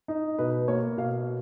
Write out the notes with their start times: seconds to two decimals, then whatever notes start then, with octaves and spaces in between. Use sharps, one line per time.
0.08 D#4
0.39 B2 B4
0.68 A#3 C#5
0.97 B2 F5